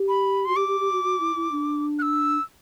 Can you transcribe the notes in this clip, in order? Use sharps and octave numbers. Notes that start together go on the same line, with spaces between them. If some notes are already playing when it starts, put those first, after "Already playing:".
Already playing: G4
B5
F#4 C6
G4 D6
G4
G4
F#4
F#4
E4
E4
D4
F#6
E6